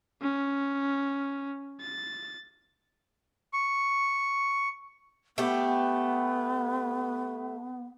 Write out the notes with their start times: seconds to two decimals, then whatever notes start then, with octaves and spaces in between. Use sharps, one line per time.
0.22 C#4
1.81 A6
3.53 C#6
5.38 A3 B3 G4